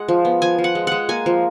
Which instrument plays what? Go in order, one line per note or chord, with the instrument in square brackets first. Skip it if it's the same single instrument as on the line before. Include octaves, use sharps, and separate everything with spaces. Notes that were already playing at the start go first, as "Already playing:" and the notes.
Already playing: [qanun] G#3 F#5
F3
B3
F3 G#5
F3
F#5
G#3
G#3 F#5
A#3 G#5
F3